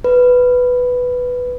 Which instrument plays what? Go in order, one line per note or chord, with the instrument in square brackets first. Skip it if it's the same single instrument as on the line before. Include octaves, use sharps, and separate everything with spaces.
[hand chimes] B4